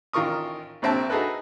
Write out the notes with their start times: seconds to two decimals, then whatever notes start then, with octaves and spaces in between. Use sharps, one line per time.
0.13 A1 D#3 F4 A#4 C#6 D#6
0.82 A#1 A#2 C4 E5 A5
1.10 D#4 F#4 G#4 A4 B4